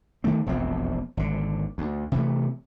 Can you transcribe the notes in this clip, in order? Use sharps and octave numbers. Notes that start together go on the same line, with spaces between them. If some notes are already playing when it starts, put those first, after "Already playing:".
D3 D#3 A3 C4
E1 A#1 F2 C4
G#1 D3
D2
C3 E3 A3